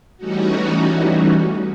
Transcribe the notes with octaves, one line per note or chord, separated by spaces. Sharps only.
E3 G3 A3 C#4 D#4 F#4